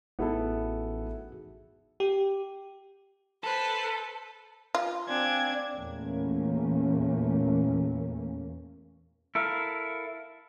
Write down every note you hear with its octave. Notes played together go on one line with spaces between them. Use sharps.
A1 B3 D#4 E4 F#4 G#4 A4
G4
A4 B4 C5 A5
F4
C4 D4 F5 G5 G#5 G#6
E2 A#2 A3 A#3 C#4
E4 A4 A#4 E5 F5